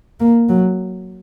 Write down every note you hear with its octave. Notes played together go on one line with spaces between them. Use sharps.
A#3
F#3